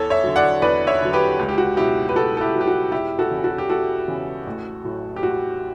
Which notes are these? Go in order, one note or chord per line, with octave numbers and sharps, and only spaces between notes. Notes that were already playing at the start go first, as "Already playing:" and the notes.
Already playing: E2 A4 C#5
C#5 E5
D3 F#3
D5 F#5
E2 B4 D5
C#5 E5
D3 F#3
G4 B4
C#2
G4
F#4
B2 F#3 E4 G4
B4
C#2 F#4 A4
A4
E4 G4
B2 F#3
G4
F#4
E1 E4 G4
F#4 A4
E2 C#3 E3
F#4 A4
G4
E1 F#4 A4
E2 C#3 E3
A1
A2 F#3
G4
A1 F#4